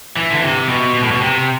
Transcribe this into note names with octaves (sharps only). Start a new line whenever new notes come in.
E3
D3
C3
B2
B2
A2
B2
C3